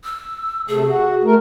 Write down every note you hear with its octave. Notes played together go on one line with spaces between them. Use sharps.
E6
C3 A3 G#4
F#4
A3 A#4